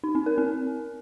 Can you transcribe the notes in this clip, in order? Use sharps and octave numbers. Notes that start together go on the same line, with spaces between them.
D#4
C4
A#4
C4